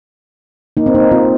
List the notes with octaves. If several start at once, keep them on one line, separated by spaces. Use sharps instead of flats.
A#3 D#4
C4
A#3 D#4
C4 F4